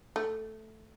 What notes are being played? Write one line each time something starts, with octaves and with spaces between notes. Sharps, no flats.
A3